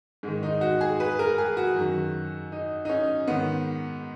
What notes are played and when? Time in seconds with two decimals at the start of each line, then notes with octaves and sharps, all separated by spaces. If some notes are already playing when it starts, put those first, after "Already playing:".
0.23 G#2 D#3 G#3
0.43 D#4
0.61 F#4
0.81 G#4
1.00 B4
1.19 A#4
1.38 G#4
1.57 F#4
1.76 F#2 D#3
2.52 D#4
2.85 D#4
2.89 C#4
3.28 G#2 D#3 B3